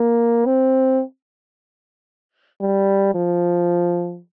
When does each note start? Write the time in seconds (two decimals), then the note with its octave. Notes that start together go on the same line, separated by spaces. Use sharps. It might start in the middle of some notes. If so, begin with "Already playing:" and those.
Already playing: A#3
0.45 C4
2.61 G3
3.15 F3